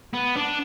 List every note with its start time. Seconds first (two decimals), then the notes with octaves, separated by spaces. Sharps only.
0.14 B3
0.37 D4